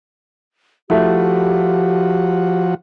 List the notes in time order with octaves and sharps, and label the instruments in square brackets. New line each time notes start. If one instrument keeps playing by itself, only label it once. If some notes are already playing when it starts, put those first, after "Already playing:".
[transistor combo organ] F3 F#4 [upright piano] A3 E4 [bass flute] G4